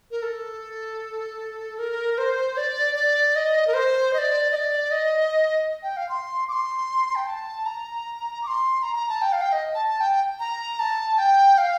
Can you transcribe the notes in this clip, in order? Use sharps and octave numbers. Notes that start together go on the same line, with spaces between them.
A#4
A4
A#4
C5
D5
D5
D#5
A#4
C5
D#5
D5
D#5
D5
D#5
G5
F5
C6
D6
C6
G5
A5
A#5
D6
C6
A#5
A#5
A5
G5
F5
G5
D#5
A5
A5
G5
A#5
A5
G5
F5